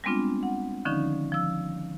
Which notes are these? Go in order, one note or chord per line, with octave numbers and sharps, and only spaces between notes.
G3 G#3 B3 C4 D4 F4
F#5
D3 D#3 F3 C#4 D#4
F3 E6